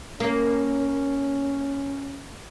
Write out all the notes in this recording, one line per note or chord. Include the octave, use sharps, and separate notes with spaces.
A#3 C#4